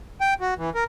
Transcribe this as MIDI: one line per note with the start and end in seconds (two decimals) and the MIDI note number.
0.21 0.34 79
0.41 0.54 66
0.58 0.70 52
0.75 0.84 70